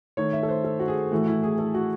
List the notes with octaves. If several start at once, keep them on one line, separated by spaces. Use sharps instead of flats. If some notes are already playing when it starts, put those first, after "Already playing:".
D#3 A3 C#5
E5
A4
C5
A4
F#4
G#4
A2 E3 A3 F#4
E4
G#4
A4
F#4